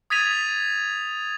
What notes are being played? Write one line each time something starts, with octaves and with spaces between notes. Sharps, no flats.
D#6 G#6 A6 B6 D#7 F7